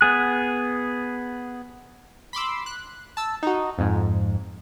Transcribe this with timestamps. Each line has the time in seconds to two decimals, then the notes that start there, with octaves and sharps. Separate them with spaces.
0.01 B3 G#4 F#6
2.33 B5 C6 D6 E6
2.66 F#6
3.17 A5 E6
3.43 D#4 F#4
3.78 F2 G#2